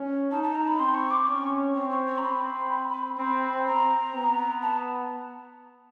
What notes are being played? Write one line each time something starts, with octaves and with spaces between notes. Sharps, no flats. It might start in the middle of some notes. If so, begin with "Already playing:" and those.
Already playing: C#4
D#4 A5
A5
A#5
B5
C4 C6
C#6
D6
C#4 C#6
C4 C#6
C#6
C#6
A#5
C4 B5
C4 B5
C4 A#5
B3
A5